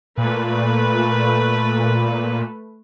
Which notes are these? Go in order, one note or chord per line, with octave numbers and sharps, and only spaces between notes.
A#2 A3 B4